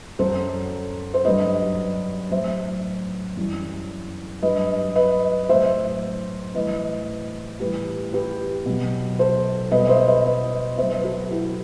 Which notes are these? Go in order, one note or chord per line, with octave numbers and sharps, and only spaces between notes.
F#2 F#3 A4 C5
C5
G2 F#3 B4 D#5
A2 F#3 C5 E5
F#2 E3 G3
G2 F#3 B4 D#5
B4 D#5
A2 F#3 C5 E5
A2 E3 G3 B4 D#5
A2 E3 G3 G4 B4
G4 B4
B2 F#3
A4 C5
B2 G3 B4 D#5
C5 E5
B4 D#5
B4 D#5
B2 C5 E5
F#3
C5
B4
F#4 A4
E4 G4